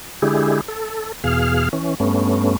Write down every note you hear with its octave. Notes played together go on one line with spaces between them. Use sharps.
D3 G#3 E4 G4 G#4
A4
E2 B2 G#4 F5 F6
E3 C#4
G2 A3 B3 C#4